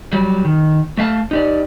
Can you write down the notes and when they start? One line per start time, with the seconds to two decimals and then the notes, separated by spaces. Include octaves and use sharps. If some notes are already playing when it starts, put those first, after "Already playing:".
0.13 F#3 G3
0.45 D#3
0.98 A3 E5 F5 A5
1.31 D#4 G4 D5